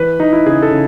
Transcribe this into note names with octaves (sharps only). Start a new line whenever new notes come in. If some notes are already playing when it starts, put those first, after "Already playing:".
Already playing: E3 B4
E3 D#4
E4
C#3 G#4
A4
C#3